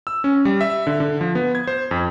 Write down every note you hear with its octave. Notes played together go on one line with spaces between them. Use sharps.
E6
C#4
G3
E5
D3
D3
F3
B3
G#6
C5
F2